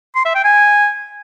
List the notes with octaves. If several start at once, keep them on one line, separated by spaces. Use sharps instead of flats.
C6
E5
G5
G#5